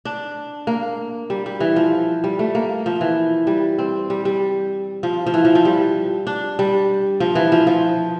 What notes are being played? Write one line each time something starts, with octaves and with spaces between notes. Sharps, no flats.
D4
A#3
G3
G3
E3
F3
G3
A3
A#3
F3
E3
G3
C4
G3
G3
F3
F3
E3
F3
F3
G3
D4
G3
F3
E3
F3
F3